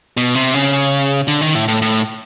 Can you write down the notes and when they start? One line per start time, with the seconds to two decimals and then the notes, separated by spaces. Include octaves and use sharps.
0.17 B2
0.35 C3
0.54 C#3
1.28 D3
1.41 D#3
1.55 A2
1.68 A2
1.82 A2